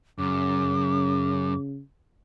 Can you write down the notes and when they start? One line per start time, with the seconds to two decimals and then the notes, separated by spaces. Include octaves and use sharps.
0.19 F#2 C#3 D6